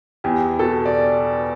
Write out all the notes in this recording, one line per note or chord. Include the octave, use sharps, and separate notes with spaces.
E2 G4
B2 A4
D5